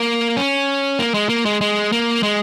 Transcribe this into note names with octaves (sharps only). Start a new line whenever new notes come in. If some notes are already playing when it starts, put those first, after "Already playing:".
Already playing: A#3
C#4
A#3
G#3
A#3
G#3
G#3
A#3
G#3